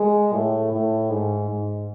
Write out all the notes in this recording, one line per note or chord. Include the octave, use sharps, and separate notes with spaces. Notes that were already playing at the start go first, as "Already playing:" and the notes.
Already playing: G#3
A2
A2
G#2
G#2